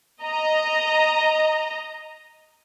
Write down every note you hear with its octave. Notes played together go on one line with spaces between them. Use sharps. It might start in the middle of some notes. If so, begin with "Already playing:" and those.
D#5 A#5